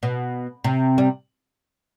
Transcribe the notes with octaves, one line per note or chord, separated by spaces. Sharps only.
B2
C3
G3